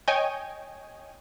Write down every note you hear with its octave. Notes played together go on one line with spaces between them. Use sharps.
C#5 D#5 G5 G#5